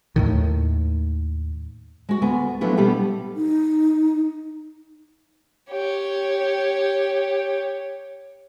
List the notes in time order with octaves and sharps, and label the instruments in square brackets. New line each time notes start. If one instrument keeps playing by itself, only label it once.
[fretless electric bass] D#2 A2 D#3
[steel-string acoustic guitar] G#3 F#4
D2 B3 D5 G#5
F3 F#3 A3 B3 D4 E4
B2 G3 B3 G4 A4
[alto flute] D#4
[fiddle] G4 C#5